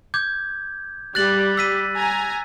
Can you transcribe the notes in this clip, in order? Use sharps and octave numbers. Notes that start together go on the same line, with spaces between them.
D6 G6 G#6
G3 G4 F#6 A6 F#7
E6 B6 D#7
G#5 A#5